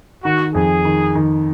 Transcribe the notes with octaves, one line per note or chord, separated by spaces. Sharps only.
D#3 F#4
F2 G#4
D#3
D#3